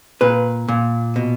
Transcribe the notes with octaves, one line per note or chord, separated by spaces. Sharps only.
A#2 B4
A#2
B2